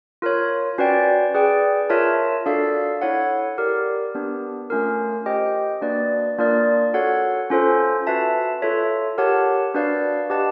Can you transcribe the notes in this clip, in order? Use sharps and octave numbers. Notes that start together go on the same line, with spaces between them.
F4 A#4 C#5
C#4 F#4 B4 D5 G5
G#4 B4 D5 G5
F4 A#4 C#5 E5 A5
D4 F#4 A4 D5 F5
E4 A4 C#5 F#5
G4 A#4 D5
B3 D4 G4 B4
A3 C#4 F4 A#4
G4 C5 D#5 G5
A#3 D4 F#4 B4 D5
A#3 D4 F4 A#4 D5
F#4 A4 C#5 F#5
C#4 F4 A4 C5
F#4 B4 E5 A5
F4 A4 C#5 E5
G4 A#4 C#5 F#5 A5
D4 F#4 B4 D5 F5
G4 B4 D#5 F#5 A5